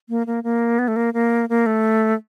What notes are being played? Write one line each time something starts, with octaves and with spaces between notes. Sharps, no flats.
A#3
A#3
A#3
B3
A3
A#3
A#3
A#3
A3